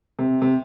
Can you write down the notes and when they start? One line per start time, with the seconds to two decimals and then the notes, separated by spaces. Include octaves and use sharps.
0.19 C3
0.42 C3